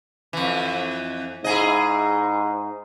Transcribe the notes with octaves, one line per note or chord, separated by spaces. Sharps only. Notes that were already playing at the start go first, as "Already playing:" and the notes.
F2 E3
G#2 E4 G#4 D#5